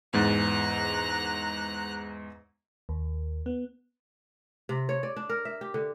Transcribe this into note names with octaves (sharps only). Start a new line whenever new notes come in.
E2 G#2 A#5 F#6 A6
D#2
B3
C3
C#5
D5
D4
A#4
E5
G4
D3